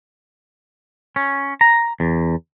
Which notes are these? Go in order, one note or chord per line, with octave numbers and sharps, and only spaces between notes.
C#4
A#5
E2